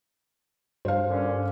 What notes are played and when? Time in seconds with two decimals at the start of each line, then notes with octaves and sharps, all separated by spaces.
0.85 G2 C5 F5
1.09 A#2 D3 C#4